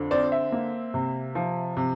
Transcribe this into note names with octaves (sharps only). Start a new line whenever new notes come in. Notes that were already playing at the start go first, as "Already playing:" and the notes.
Already playing: F2 D3
C4 D5
E5
A#3
C3
F3
C3